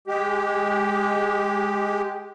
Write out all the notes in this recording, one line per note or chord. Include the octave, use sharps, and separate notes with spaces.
G#3 G4